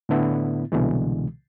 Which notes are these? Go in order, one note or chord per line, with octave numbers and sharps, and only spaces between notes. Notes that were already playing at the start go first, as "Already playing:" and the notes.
A2 D3 B3 E4
C2 B2 D3 E3 G#3